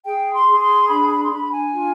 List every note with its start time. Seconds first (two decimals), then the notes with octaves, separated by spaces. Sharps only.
0.05 G#4 G5
0.33 C6
0.47 G#4
0.61 C6
0.89 D4 B5
1.10 B5
1.25 C6
1.31 D4 B5
1.51 G#5
1.72 F4